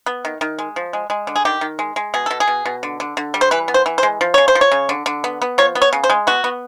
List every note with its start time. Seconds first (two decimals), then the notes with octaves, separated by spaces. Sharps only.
0.06 B3
0.25 D#3
0.41 D#3
0.59 G#3
0.76 F3
0.93 G#3
1.10 G#3
1.27 D3
1.36 G#4
1.45 D#3 G4
1.61 D#3
1.79 G#3
1.96 G#3
2.14 B2 G#4
2.26 B2 A4
2.40 G#4
2.48 B2
2.65 B2
2.83 D3
3.00 D3
3.17 D3
3.34 G3
3.41 C5
3.51 E3 B4
3.68 B3
3.74 C5
3.86 E3
3.98 C5
4.03 G#3
4.21 F3
4.34 C#3 C#5
4.48 C5
4.55 F3
4.61 C#5
4.72 C#3
4.89 D3
5.06 D3
5.24 B3
5.42 B3
5.58 F3 C#5
5.75 B3
5.82 C#5
5.93 C#3
6.04 C5
6.10 G#3
6.27 B3 F#4
6.44 B3